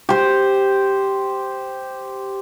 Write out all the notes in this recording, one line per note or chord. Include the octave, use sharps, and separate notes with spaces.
G4 C5